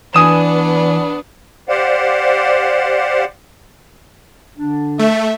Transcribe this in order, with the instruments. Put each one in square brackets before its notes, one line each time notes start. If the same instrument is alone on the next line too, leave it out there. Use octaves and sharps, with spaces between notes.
[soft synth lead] E3 [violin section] B3 D4 [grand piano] G#5 D#6 E7
[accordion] G4 C5 D5 F5 F#5
[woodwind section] D3 D4
[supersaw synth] A3 [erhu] E5